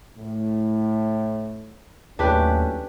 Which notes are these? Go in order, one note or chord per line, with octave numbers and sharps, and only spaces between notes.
A2
D#2 A2 F#3 C#4 D4 G4 B4